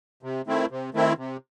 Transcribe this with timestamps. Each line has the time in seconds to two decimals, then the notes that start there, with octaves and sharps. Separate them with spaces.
0.23 C3
0.47 D#3 A3 C4 E4
0.71 C3
0.94 D#3 A3 C4 E4
1.18 C3